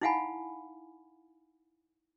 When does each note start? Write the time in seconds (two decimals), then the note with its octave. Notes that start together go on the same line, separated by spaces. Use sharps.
0.01 D#4 E4 F5 F#5 G#5 B5